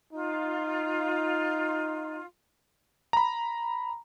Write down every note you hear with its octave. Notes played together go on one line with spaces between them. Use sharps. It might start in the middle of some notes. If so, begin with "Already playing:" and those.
D#4 F4
A#5 B5